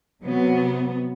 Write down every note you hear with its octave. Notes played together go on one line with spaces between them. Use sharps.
C3 F#3 B3